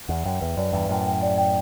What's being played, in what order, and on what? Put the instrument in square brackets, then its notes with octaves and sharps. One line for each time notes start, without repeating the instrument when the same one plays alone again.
[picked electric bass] E2 [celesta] F#5
[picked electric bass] F#2 [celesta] G5
[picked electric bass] E2 [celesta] B4
[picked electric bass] F#2 [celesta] D5
[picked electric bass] E2 G2 [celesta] B4
[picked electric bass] F#2 A2 [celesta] G5
[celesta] G5
D5
G5